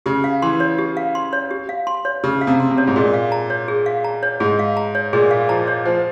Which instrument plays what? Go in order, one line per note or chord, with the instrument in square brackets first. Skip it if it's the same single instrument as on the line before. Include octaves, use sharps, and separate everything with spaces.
[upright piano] C#3 [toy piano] G4
[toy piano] F5
[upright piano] E3 [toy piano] C6
[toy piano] C#5
G4
F5
C6
C#5
G4
F5
C6
C#5
[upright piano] C#3 [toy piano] G4
[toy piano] F5
[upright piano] C3
[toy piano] C6
[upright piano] C3
[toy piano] C#5
[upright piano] G#2
[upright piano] A#2 [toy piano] G#4
[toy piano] F5
A#5
C#5
G#4
F5
A#5
C#5
[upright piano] G#2 [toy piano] G#4
[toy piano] F5
A#5
C#5
[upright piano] A#2 [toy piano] G#4
[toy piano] F5
[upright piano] F3 [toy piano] A#5
[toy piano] C#5
[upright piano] F3 [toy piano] C5